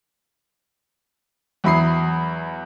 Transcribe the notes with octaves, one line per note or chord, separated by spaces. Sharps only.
E2 F#3 E4 B5 D#6 C7